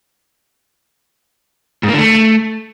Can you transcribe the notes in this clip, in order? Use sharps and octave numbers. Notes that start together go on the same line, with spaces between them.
G#2
A#3
D3
A3